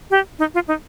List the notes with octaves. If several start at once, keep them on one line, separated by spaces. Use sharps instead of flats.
G4
D#4
F4
D#4